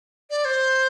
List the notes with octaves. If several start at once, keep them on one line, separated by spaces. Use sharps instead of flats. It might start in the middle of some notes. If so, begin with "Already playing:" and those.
D5
C5